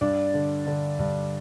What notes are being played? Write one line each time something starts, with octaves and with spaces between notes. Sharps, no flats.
G2 D4 D5
D3
D3
G2